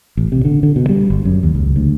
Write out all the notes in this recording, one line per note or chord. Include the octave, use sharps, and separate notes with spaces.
A1
C3
D3
D3
B2
G3
G1
F#2
D#2
C#2
D2